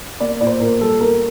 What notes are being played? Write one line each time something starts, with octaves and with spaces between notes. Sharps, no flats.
A#3 D5
A#2 D5
C5
A#2 A#4
G3 A4
A#3 A#4